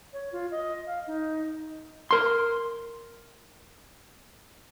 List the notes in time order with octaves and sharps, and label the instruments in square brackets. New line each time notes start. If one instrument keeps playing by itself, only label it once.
[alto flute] C#5
F4
D#5
F5
D#4
[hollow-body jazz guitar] A#4 C6